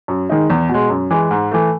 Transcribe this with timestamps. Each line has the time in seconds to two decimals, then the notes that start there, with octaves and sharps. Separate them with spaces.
0.08 F#2
0.30 D#3 G#3 D#4
0.50 E2
0.69 B2 G#3
0.90 F#2
1.11 E3 G#3
1.31 G#2
1.51 E3 A3